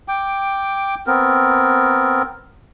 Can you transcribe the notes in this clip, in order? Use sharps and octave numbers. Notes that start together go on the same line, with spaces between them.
G5 D6
B3 C4 A#4